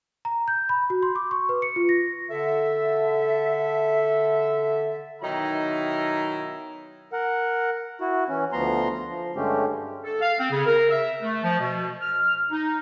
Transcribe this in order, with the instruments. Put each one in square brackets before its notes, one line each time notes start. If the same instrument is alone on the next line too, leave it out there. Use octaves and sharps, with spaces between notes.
[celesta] A#5
G6
B5
F#4
C6
D6
C#6
B4
C#7
F4
A#6
[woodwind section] D3 A4 E5
[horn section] B2 D#3 F#3 D#4 E4 A#5
[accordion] A#4 F#5
E4 F#4
E3 C#4
D2 F3 B3 A#5 C6
F3
G2 D3 G#3 A3 C#4 G4
[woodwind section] A4
F5
C4
C#3
A#4
E5
A3
F3
B2
F6
D#4